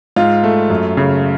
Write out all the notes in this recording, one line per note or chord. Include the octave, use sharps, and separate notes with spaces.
G#2 F4
A3
F#2
C#3